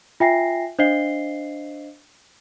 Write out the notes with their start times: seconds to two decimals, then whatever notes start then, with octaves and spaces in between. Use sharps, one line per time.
0.20 F4 E5 G5 G#5 A#6 C7
0.79 D4 C5 D#5 F5 C7 G7